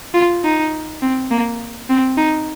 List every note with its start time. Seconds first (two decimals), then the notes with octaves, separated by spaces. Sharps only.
0.14 F4
0.44 D#4
1.02 C4
1.31 A#3
1.90 C4
2.18 D#4